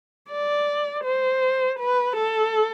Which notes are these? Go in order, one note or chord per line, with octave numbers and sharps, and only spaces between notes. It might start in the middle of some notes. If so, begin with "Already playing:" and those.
D5
C5
B4
A4